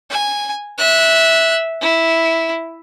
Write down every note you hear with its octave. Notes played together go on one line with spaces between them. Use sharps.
G#5
E5 F#6
E4